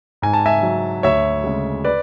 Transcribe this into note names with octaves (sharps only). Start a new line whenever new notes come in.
G#2 G#5
A5
E5 G#5
F#3
D2 C#5 E5
C#3 G#3
B4 D5